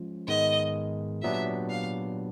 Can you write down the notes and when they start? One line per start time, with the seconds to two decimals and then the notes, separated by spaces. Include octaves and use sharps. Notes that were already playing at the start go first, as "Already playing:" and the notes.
Already playing: F3 G#3 C#4 F4
0.28 G#2 D#3 G#3 B3 D#5
1.22 A#2 F#3 B3 D4 G4 E5
1.70 F5